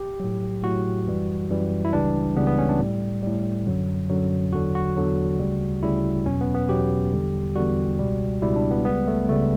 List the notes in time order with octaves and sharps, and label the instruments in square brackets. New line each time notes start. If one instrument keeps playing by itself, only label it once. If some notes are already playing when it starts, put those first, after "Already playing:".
Already playing: [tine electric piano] G4
A2 F#3
A2 F#3 F#4
F#2 E3 G3
F#2 E3 G3
E4
C#2 C#3 E3 G3 D4
C#2 C#3 E3 G3 B3
B3
C#4
D4
A2 G3
A2 G3
F#2 D3 F#3
F#2 D3 F#3
E2 D3 F#3 F#4
F#4
E2 D3 F#3
D2 C#3 G3
D2 C#3 G3 E4
E2 B2 F#3 C#4
B3
B3
E2 B2 F#3 G4
E2 D3 G3
E2 D3 G3 F#4
C#2 B2 G3
C#2 B2 G3 E4
D4
B3
C#2 C#3 G3 B3
A3
C#2 C#3 G3 A3